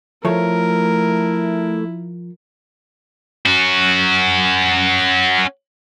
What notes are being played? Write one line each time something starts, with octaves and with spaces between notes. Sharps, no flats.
F3 A3 E4 A#4 C#5
C#4 F#4